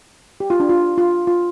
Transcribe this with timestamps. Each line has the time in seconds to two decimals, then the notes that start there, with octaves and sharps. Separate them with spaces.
0.40 G4
0.50 F4
0.60 D4
0.70 F4
0.98 F4
1.27 F4